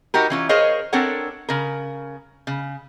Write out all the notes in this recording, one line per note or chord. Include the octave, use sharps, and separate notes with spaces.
D#4 F#4 G4 A#4
E3 C#4 F4
G#4 A#4 C5 C#5 D#5 F5
C4 D4 A4 A#4 C#5 F#5
C#3 A#4
C#3